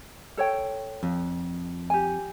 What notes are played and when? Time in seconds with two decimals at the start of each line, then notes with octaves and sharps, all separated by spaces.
0.37 A4 C#5 G5
1.03 F2
1.90 G4 G#5